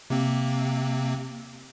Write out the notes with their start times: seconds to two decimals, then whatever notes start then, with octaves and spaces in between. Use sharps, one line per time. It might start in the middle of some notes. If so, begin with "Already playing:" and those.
0.10 C3 A#3 C4